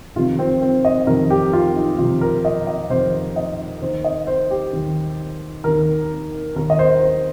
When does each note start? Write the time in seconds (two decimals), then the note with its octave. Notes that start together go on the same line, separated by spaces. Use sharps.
0.16 F2 C3 D#3 F4
0.39 C4
0.62 C4
0.85 D#5
1.07 F2 C3 D#3 A#4
1.30 G4
1.53 F4
1.76 D#4
1.99 F2 C3 D#3 F4
2.21 A#4
2.45 D#5
2.67 D#5
2.90 F2 C3 D#3 C5
3.13 C5
3.36 D#5
3.82 D#2 D#3 C5
4.05 D#5
4.27 C5
4.51 G4
4.73 D#2 D#3
5.64 D#2 D#3 A#4
6.56 D#2 D#3 A#4
6.70 D#5
6.79 C5
7.01 C5